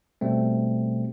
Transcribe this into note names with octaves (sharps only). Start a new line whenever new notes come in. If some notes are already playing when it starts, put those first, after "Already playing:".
B2 G3 A3 C4